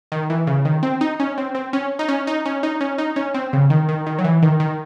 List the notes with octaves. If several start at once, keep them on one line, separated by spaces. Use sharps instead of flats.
D#3
E3
C#3
D#3
C4
D#4
C#4
C4
C4
C#4
D#4
C#4
D#4
C#4
D#4
C#4
D#4
C#4
C4
C#3
D#3
D#3
D#3
F#3
E3
D#3
D#3